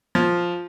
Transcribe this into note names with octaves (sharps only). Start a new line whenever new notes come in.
F3